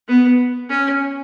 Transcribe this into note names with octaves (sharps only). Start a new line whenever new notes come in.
B3
C#4